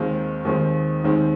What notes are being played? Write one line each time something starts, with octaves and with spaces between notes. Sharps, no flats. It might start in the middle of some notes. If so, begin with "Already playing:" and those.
Already playing: D#2 D#3 G#3 C4 F4
D#2 D#3 G#3 C4 F4
D#2 D#3 G#3 C4